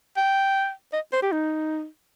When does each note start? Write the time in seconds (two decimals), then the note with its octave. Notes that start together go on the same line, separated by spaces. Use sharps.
0.17 G5
0.93 D#5
1.13 C5
1.23 G4
1.32 D#4